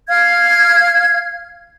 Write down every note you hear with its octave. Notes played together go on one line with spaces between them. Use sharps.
F5 F6 G#6